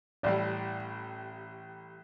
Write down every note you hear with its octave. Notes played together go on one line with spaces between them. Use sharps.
A1 A2 G3 D5